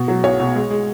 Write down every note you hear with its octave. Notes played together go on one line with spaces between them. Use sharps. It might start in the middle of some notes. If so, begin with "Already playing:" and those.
Already playing: B2
F#3
B1 C#5
B2
G#3
G#3